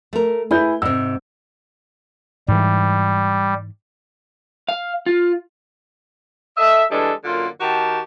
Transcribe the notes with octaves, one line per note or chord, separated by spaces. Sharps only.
A3 A#4
E4 G#4 B4 G6
G#2 C3 E6
G#2 E3 G3
F5
F4
A4 D#5 E5
E3 G3 G#3 D4 A4
F#2 D3 A#3 F4
D#3 F#4 G4 A5